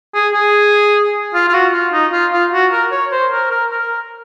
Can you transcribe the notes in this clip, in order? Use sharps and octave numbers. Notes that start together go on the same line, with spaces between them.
G#4
G#4
F4
F4
F#4
F4
D#4
F4
F4
F#4
A#4
C#5
C5
A#4
A#4
A#4